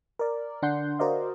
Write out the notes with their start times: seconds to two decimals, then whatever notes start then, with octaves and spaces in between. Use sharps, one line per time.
0.19 A#4 D5
0.62 D3 D4 F#5 C6 G6
0.99 F#4 A#4 C5 D5 D#5 F5